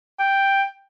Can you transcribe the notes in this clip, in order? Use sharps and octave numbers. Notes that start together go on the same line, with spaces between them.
G5